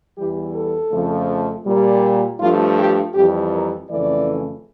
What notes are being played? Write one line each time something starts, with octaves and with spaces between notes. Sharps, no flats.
E2 E3 G3 G4
A4
F2 C#3 F3 A3
A#2 G3
G2 F3 A3 F4
G4
F2 E3 G3 G4
A#4
F2 C#3 E3 A3 D5